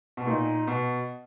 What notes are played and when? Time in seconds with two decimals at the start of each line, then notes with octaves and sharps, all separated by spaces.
0.17 B2
0.27 A#2 D#4
0.67 B2